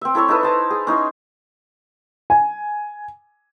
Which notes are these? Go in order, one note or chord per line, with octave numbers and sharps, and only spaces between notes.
C4 E5
E4 A4 C#5 E5
D#4 E4 A4 B4
C5 A5 A#5
G#4
C#4 D#4 E4 C5
G#5